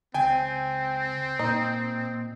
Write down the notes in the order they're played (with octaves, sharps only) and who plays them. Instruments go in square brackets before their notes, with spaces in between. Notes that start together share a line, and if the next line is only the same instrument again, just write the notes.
[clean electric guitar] C#2 [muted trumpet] C4 [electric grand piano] G5 G#5
[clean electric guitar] A#2 [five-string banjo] D#4